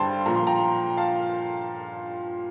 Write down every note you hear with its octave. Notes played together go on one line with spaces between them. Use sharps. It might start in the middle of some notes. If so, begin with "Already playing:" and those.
Already playing: G2 D3 G3 C5 G5 A5 C6
A#2 F3 A#5
C6
G5 A#5
F5 A5